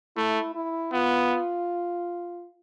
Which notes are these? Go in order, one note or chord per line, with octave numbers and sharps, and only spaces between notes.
A3 E4
E4
B3 F4